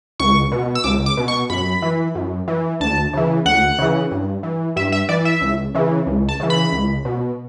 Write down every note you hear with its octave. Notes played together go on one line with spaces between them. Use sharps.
C#2 C#6
B2
E6
C#2 D6
D6
B2
C#6
F#2 B5
E3
F#2
E3
D2 A5
C#3 E3
D2 F#5
C#3 E3
G2
E3
G2 E5
E5
E3 D5
E5
C#2
C#3 E3
C#2
A5
C#3 E3
B5
C#2
B2